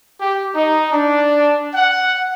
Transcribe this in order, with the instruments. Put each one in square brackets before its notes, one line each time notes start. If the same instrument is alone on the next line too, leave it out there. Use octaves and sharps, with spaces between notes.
[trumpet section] G4
D#4
D4
F#5